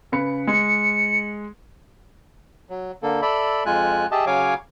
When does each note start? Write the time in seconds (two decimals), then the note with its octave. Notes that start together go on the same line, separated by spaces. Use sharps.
0.12 C#3 B4 C#7
0.47 G#3 C#7
2.69 F#3
3.03 D3 A#3 A4
3.22 A4 D5 E5 B5
3.66 F2 G#3 F4 G#5 F#6
4.11 G4 G#4 D#5 E5 A5
4.27 C#3 F#3 C#5 F5 G#5 D6